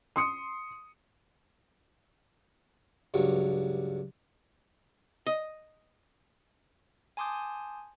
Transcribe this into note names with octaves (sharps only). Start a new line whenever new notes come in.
C6 D#6 C#7
C#2 G2 F#3
D#5
G#5 A5 C6 D6 D#6 G6